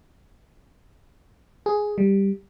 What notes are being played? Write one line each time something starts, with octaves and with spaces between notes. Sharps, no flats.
G#4
G3